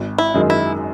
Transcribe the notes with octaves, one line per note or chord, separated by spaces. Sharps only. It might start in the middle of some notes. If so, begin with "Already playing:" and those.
Already playing: G#1
E4
F#2 D#3 G#3
E4